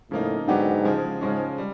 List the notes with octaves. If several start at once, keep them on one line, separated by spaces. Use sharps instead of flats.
A2 C#3 F3 A#3 D#4
G#2 D3 F#3 B3 D4 G4
C#3 F3 G#3
G#2 C#3 F3 G#3 C#4
G3